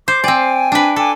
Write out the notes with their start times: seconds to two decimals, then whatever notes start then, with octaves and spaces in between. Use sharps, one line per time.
0.08 C5 D6
0.24 C4 D5 G5 G#5
0.72 D4 B4
0.96 A4 G5 G#5 D6